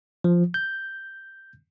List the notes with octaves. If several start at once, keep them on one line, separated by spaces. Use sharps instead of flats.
F3
G6